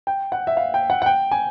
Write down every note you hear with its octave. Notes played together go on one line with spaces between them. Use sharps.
G5
F#5
E5
F5
G5
F#5
F#5
G5
G#5